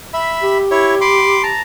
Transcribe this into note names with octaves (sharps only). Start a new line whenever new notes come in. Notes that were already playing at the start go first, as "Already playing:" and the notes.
E5 B5
G4
E4 C#5
B5 C6 D6
A5 A#5